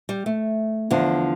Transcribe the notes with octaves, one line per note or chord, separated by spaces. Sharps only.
G3
A3
E2 D3 F3